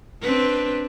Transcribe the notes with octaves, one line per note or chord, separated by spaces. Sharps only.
C4 D4 B4